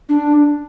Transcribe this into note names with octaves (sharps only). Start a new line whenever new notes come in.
D4